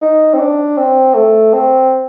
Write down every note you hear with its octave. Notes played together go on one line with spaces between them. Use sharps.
D#4
C4
D4
C4
A3
C4